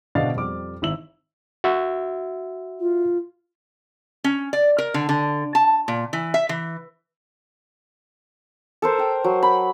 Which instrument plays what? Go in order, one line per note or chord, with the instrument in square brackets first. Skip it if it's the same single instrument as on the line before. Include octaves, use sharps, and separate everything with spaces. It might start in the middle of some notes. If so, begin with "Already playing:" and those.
[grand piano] B2 D3 D4 D#5 F5 A6
F2 G3 D6 F6
G#1 E4 E6 F#7
[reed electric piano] F#4 E5
[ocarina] F4
[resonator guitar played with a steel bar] C#4
D5
A#4
D3
D3
A5
A#2
E3
E5
E3
[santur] A4 A#4 C5
A#4 G5
F#3
B5